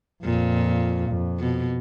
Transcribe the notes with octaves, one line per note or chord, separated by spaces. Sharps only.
F2 A#2
F2
B2